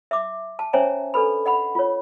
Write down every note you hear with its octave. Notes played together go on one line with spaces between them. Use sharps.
E5 D6
A5
C#4 C5 C#5 E5 G#5 A#5
D4 A4 B4 B5
D#5 F#5 B5
F4 C#5